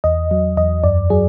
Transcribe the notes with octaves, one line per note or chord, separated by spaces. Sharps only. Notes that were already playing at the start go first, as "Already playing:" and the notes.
E2 D#5
F#3
E2 D#5
F#2 D5
F#3 G#4